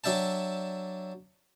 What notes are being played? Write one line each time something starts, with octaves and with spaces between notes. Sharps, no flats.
F#3 D4 E5 G5 A5